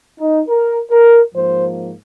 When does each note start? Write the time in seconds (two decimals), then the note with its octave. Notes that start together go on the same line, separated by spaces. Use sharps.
0.19 D#4
0.48 A#4
0.90 A#4
1.33 G#2 F3 A#3 C5